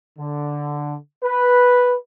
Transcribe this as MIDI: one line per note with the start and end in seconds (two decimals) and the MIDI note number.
0.19 0.95 50
1.23 1.95 71